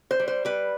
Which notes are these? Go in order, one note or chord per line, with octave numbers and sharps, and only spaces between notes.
C5
G3
C5
G3 B4